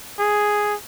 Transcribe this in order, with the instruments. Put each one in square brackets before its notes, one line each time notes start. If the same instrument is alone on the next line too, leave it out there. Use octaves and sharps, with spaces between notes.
[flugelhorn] G#4